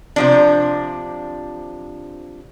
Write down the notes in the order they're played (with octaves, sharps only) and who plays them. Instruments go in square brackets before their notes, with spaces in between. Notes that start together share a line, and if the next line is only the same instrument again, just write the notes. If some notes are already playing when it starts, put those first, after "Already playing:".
[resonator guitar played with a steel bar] C3 F3 D4